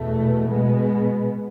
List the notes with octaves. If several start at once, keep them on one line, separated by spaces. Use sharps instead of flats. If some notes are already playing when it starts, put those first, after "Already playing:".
Already playing: E2 B2 A3
B2 G#3 B3